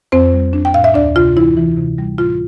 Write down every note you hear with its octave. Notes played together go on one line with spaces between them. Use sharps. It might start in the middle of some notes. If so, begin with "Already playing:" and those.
F2 C4 C5
G3
D4
G5
A2 F5
E5
D2 D4 D5
C3 F4
E3 E4
E3
C3
G3
A2 F4